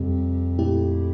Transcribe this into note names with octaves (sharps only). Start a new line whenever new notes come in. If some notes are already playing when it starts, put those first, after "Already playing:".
Already playing: F2 C3 G3 C4 G4
A#2 A3 E4 G4